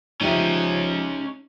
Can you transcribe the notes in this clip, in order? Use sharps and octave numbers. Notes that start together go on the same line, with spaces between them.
F3 C#4 D#4 G4 D#5 E5